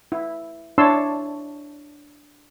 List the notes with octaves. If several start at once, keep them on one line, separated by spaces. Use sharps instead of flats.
E4
D4 E4 C#5 A5 C6 E6